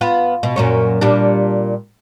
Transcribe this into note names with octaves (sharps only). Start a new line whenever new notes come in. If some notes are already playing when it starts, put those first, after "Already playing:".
B3 F4 B4
B2
F#2 A#2 C#4
A#2 G3 D4